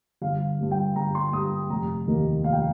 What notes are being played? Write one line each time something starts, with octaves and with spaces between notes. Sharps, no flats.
G1 F5
G2 G3
G5
G1 A#5
C6
G2 G3 D#6
F1 A#5
D#2 D#3 A#3
F1 F5
G5